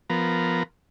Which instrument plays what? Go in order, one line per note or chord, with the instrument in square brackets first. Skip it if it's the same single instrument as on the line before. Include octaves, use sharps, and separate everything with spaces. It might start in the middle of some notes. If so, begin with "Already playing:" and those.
[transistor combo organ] F3 B3 A#4